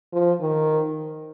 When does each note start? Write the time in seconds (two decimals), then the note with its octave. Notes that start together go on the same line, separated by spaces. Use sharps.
0.13 F3
0.41 D#3